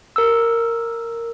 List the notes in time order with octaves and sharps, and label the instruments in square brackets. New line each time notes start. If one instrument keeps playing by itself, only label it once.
[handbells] A#4 E6